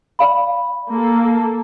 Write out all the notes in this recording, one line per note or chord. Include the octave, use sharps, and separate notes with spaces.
D5 F5 B5
A#3 A4